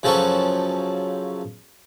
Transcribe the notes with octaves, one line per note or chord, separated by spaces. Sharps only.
F#2 C#3 F3 A4 B4 C#6